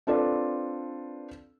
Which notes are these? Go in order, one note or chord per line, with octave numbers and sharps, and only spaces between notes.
C4 D4 F4 A4 B4 D5